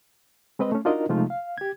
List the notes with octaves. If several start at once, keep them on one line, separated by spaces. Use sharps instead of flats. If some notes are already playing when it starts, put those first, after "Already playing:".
G#3 C4 B4 D#5
A3 C#4
D4 D#4 F4 F#4 A#4 D#5
C3 F3 G#3 A3 D#4 F4
F5
G4 G#6